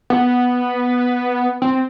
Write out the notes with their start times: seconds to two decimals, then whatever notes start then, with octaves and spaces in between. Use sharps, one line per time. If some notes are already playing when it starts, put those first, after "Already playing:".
0.10 B3
1.62 C4